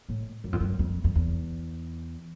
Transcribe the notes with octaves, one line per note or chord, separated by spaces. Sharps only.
A2
F#2
F2
F#2
F2
F2
E2